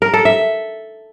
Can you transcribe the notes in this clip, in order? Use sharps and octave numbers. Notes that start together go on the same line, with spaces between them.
A#4
A4
E5